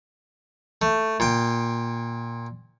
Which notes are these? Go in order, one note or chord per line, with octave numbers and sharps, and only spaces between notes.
A3
A#2 G5